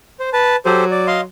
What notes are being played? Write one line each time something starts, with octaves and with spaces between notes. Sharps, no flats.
C5
B4 A5
F#3 G4 A4 C5
D5
D#5 F5 C6